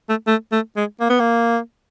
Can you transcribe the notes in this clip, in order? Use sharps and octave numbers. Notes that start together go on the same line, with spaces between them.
A3
A3
A3
G#3
A#3
B3
A#3